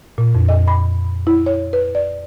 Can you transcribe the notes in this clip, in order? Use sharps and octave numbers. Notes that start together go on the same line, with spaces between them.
A#2
F2
D#5
B5
E4
C#5
B4
D5